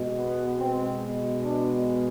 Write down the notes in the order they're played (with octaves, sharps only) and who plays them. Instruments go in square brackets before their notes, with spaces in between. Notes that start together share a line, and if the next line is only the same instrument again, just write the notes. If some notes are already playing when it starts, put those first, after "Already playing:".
Already playing: [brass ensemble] B2 G#3
B3
C4
D4